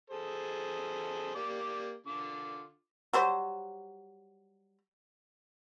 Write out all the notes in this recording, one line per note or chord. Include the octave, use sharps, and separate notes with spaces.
G#4 A4 C5
A#3 G4 D5
D3 F4 D6
F#3 G3 C5